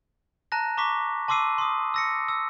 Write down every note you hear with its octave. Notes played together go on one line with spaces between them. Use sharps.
A5 A#5 F#6 A#6
A#5 C#6 D6 B6
A5 C6 D6 E6 C7 D#7
C6 D#6
E6 A#6 C#7
E6